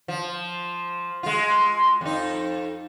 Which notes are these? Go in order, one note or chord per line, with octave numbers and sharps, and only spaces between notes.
F3
G#3 F4
F2 D#4